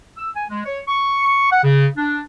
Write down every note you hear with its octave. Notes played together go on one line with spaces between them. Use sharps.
E6
G#5
G#3
C#5
C#6
F#5
C#3
D4